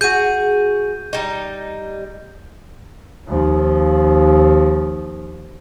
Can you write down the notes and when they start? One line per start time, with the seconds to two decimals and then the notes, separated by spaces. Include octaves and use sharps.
0.01 F#4 G#4 G6 D#7
1.13 G3 D#4
3.28 D#2 F3